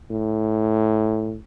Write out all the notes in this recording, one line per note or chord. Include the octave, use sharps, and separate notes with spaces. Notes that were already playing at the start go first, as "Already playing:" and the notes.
A2